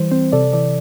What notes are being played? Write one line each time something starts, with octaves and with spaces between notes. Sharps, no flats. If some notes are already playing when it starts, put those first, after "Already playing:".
Already playing: E3 G3 C5
C4 C5
C3 A4 D5
E3 A4 D5